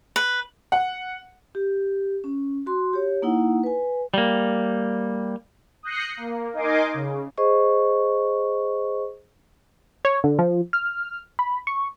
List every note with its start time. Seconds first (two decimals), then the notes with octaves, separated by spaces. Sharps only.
0.16 B4
0.72 F#5
1.55 G4
2.24 C#4
2.66 F#4 C6
2.93 G4 C#5
3.22 A#3 D#4 E4 F#5
3.63 B4 G#5
4.14 G3 A#3
5.83 D#6 F#6 G6 A#6 C7 C#7
6.17 A#3
6.53 D#4 A#4 D#5 G#5 C6 D6
6.94 C#3
7.38 G#4 C5 D#5 C#6
10.05 C#5
10.24 D3
10.39 F3
10.73 F6
11.39 B5
11.67 C#6